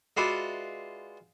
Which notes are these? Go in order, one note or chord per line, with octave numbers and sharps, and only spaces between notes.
G#3 F4 F#4 B4 D5 E5